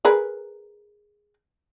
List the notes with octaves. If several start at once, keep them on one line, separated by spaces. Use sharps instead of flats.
G#4 A#4 B4